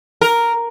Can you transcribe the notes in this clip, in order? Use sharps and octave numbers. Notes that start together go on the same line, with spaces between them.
A#4